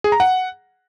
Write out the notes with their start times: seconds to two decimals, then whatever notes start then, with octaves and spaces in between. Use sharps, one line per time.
0.04 G#4
0.12 A#5
0.20 F#5